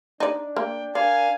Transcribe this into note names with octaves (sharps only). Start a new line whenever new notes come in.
D4 D#4 D5
A#3 G5
D4 A#4 D5 F5 G#5